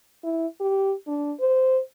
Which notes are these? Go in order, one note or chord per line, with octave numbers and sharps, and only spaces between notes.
E4
G4
D4
C5